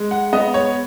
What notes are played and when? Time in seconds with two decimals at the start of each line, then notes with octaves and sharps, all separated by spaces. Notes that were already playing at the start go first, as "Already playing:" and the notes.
Already playing: G#3
0.11 F#5
0.33 B3 D#5
0.54 C#5